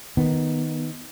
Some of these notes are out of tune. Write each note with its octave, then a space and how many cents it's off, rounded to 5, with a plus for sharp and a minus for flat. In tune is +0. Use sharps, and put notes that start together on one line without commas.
D#3 +0 B3 +0